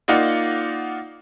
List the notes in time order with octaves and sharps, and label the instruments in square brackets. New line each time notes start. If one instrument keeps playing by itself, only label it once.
[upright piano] A#3 D#4 F4 D5 F#5